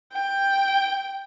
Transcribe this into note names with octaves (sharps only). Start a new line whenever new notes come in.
G5